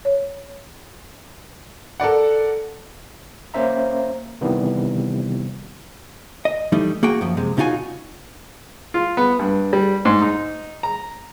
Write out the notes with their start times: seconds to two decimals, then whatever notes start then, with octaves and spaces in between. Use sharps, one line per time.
0.05 C#5
2.00 A4 A#4 D5 F#5
3.54 A#3 C#4 C5 E5 A#5
4.41 C3 D#3 E3 G3 B3
6.45 D#5
6.72 E3 G3 A3 D#4
7.03 A#3 F#4 G#4 G5
7.21 F#2 F3
7.37 C3 G#3
7.57 B1 C#3 D#4 F4 F#4 G#5
8.94 F4
9.17 B3
9.39 G2
9.73 G3
10.05 G#2
10.22 D#4
10.83 A#5